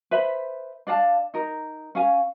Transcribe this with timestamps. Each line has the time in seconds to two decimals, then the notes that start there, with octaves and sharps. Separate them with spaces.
0.11 B4 C5 E5 B5
0.87 D4 D5 F5 A5
1.34 D#4 A#4
1.95 C#4 F5 G#5